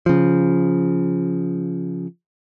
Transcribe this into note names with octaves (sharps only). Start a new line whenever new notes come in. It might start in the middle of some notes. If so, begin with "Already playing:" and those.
C#3 F3